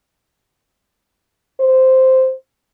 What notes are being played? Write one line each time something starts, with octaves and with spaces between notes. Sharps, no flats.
C5